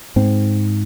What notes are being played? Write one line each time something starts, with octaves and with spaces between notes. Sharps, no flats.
G#2 C4